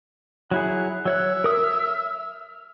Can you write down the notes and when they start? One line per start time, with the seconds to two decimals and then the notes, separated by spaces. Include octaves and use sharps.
0.51 F#3 E4 G#4 F#5
1.05 F#3 C#5 E5 F#6
1.44 A#4 D#6
1.64 F6